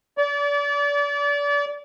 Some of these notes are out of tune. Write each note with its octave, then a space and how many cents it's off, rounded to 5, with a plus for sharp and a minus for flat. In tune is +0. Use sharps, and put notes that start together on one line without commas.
D5 -35